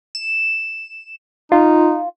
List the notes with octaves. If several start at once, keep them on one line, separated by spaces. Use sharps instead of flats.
E7
D#4 F4